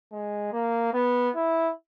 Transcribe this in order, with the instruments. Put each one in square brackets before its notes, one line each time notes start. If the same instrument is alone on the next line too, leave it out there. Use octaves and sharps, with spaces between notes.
[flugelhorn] G#3
A#3
B3
E4